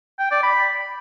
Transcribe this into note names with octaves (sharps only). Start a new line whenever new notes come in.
G5
D5
B5